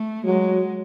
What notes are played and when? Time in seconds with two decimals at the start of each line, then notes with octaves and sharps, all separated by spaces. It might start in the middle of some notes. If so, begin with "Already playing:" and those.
Already playing: A3
0.25 F#3 G#3